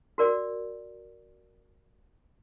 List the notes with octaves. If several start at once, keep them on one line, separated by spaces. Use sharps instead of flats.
F#4 A#4 D5